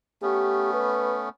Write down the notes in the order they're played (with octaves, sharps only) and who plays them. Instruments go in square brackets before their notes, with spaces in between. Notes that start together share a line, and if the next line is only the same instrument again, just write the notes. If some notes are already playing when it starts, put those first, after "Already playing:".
[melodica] A3 B3 C#4 [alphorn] G4
[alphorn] B4